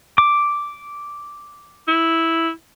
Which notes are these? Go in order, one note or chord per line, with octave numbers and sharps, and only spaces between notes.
D6
E4